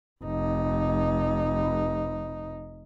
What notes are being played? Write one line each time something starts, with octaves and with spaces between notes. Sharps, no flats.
F1 D#4